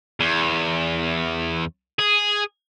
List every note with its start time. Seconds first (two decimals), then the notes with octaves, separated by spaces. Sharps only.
0.20 E2
1.99 G#4